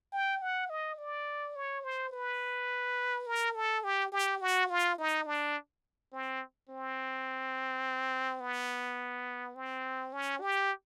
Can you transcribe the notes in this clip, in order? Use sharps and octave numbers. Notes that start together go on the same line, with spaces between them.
G5
F#5
D#5
D5
C#5
C5
B4
A#4
A4
G4
G4
F#4
F4
D#4
D4
C4
C4
B3
C4
C#4
G4